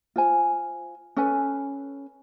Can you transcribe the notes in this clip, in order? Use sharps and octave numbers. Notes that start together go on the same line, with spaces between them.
F4 C5 G#5
C#4 A4 B4 G#5